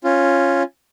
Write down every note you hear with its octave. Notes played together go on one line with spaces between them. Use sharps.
C#4 F4